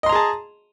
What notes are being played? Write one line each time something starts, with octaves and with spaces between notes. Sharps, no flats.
G#4 D#5 A5 A#5 C6